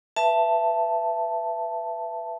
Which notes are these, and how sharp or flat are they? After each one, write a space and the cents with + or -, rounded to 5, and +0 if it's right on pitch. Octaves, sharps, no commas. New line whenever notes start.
B4 +0 E5 +20 A5 +0